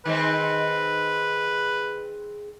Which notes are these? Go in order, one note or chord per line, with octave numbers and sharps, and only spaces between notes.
D#3 G#3 C4 B4